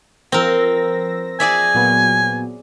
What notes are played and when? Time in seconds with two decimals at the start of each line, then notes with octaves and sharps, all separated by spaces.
0.32 F3 C4 A#4 E6 A#6
1.40 G#4 D5 E5 G#5
1.74 A#2 F#3 B3